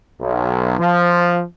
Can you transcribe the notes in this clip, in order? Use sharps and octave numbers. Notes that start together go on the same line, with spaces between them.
B1
F3